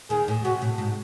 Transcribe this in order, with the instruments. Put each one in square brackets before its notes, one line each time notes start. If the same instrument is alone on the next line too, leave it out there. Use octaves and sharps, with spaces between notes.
[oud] D#2 D#3 [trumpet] G#4
[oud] A2
[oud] C3 [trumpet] F#4
[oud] A2
G#2